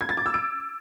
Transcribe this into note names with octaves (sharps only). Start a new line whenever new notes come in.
G#6
A6
D6
E6
D7